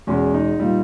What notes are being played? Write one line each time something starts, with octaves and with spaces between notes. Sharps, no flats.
E2 B2 G#3 C#4
D#4
A#2 G3